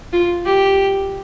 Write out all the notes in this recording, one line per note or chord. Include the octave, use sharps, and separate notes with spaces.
F4
G4